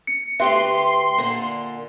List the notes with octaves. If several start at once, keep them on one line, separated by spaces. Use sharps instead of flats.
C#7
D2 G4 B4 E5 C6
A#2 D3